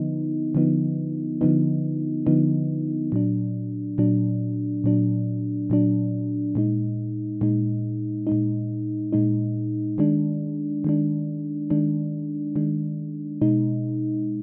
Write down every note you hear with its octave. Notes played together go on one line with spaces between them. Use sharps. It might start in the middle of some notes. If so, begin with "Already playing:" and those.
Already playing: D3 F3 B3 D#4
D3 F3 B3 D#4
D3 F3 B3 D#4
D3 F3 B3 D#4
A#2 F#3 D4
A#2 F#3 D4
A#2 F#3 D4
A#2 F#3 D4
A#2 G#3 D#4
A#2 G#3 D#4
A#2 G#3 D#4
A#2 G#3 D#4
D#3 G#3 D4
D#3 G#3 D4
D#3 G#3 D4
D#3 G#3 D4
B2 G#3 D#4